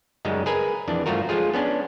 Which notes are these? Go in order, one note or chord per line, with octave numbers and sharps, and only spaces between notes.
F#2 C#3 G3 G#3 D#4
G#4 A#4 B4 G#5
F2 E3 D4
G2 F3 A3 F4 F#4 A#4
F3 G#3 F4 G#4
B3 C#4 D4